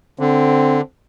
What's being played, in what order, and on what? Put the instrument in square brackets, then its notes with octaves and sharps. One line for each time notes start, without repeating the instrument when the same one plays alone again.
[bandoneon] D3 [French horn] C4